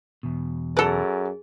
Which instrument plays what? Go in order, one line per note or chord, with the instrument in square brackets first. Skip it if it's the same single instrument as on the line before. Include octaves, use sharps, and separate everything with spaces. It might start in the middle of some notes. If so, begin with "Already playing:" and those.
[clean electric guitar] E2 B2
[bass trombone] F#2 [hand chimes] G#4 [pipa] A4 B4